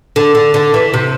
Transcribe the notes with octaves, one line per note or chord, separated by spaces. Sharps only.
D3
D3
D3
E3
C3